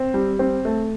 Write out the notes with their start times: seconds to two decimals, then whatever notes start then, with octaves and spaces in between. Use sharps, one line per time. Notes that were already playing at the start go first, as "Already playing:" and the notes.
Already playing: C4
0.14 G3
0.39 C4
0.65 A3